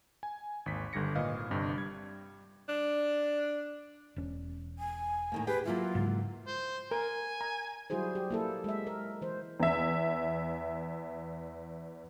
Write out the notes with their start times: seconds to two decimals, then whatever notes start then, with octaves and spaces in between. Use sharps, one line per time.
0.23 G#5
0.66 G#1 D#2 B6
0.93 G1 D3 G3 G#6 A#6 C#7
1.16 G#1 A#2 B4 D#5 F5
1.51 G1 G2 C3
1.77 G3 G#6
2.69 D4
4.16 E1 C#4
4.79 G#5
5.32 A2 D#3 A#3
5.47 G4 G#4 B4 G5
5.65 F#3 A#3 E4 F4
5.95 G#2 C#3 G#3
6.47 C5
6.91 A#4 G#5
7.41 A#5
7.90 F#3 G3 E4 F#4 G#4 C5
8.15 G4
8.31 A#3 E4 A4
8.64 G#3 E5
8.87 A#4
9.22 E3 C5
9.60 E2 E5